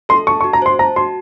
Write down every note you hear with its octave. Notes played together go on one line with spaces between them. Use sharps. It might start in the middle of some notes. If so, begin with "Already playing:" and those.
A4 C6
A5 C#6
C#6
F#4
A#5
C5 C6
A5 A#5
F#4 C6